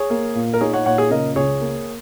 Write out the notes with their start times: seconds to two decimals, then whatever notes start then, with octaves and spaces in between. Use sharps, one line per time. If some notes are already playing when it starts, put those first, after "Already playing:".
Already playing: G#4 C#5
0.10 A#3
0.35 A#2
0.53 A#4
0.61 D#4 G#4 C#5
0.73 C#5 F#5
0.86 A#2 C#5 F#5
0.98 G#4 C#5
1.11 C#3 A#4 D#5
1.36 C#2 G#4 C#5
1.61 A#3